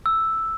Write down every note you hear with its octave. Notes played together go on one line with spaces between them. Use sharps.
E6